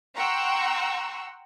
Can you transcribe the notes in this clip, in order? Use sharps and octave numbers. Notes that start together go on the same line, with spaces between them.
F#5 G5 A#5 C6 C#6 E6